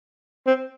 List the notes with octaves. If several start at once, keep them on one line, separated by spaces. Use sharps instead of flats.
C4